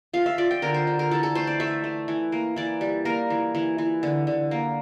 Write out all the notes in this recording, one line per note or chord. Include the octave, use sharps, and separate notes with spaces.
F3 F5
E5
F3 D5
G5
D3 A#4
C5
D3
A#4
E3 A4
A4
A3 C5
D5
A3 E5
A3
E3
A#3
E3 D5
G3
A#3 A#4
E3
E3
E3
D3
D3
A#3